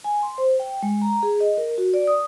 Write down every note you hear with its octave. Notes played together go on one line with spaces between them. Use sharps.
G#5
C6
C5
G5
G#3
A#5
G#4
D#5
A#4
F#4
D5
D#6